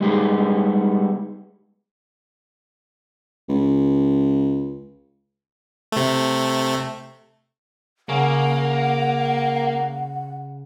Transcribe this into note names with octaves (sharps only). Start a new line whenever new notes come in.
G3 G#3 B3 D#4 G4 G#4
C#2
C3 A3
C#3 A#3 F#5